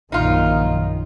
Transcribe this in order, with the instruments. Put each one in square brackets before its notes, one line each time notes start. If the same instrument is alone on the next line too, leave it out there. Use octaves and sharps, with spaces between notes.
[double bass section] A#1 F#2 D#3 [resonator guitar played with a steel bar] D#4 F4